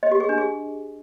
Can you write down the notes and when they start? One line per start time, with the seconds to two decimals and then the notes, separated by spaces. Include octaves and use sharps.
0.03 D#5
0.12 G4
0.20 G#4
0.29 D4
0.38 G#4